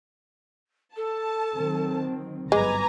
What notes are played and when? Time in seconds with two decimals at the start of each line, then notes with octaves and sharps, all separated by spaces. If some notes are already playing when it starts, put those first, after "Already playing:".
0.96 A4 A5
1.55 D#3 F#3 C4
2.52 G1 G#2 F#3 G#3 B4 G#5 A#5 D6